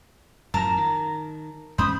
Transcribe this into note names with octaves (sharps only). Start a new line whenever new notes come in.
F#2 A2 F3 A#4 A5 A#5
D#3
E2 G#2 C#4 C5 B5 D#6